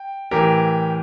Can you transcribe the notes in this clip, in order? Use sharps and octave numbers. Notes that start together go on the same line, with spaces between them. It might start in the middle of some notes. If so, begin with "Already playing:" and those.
Already playing: G5
A2 E3 G4 A#4